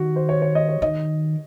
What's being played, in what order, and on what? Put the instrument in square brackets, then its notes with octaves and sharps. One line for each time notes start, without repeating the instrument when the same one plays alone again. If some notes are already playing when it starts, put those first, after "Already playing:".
Already playing: [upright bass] D#3 [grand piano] F#4
[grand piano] C5
C#5
C#5
D#5
C#5
[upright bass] D#3 [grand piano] D#5